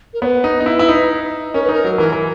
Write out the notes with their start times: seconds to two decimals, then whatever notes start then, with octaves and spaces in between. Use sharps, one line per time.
0.14 A#4
0.22 B3 C#5
0.26 B4
0.44 D#4
0.61 D#4
0.66 E4
0.79 E4
0.88 D#4
1.54 C#4 A#4
1.63 B4
1.69 D#4 A#4
1.84 F#3
1.98 E3 A#4
2.13 E3